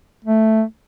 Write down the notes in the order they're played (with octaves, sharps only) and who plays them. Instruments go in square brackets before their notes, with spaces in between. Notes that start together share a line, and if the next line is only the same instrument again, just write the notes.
[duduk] A3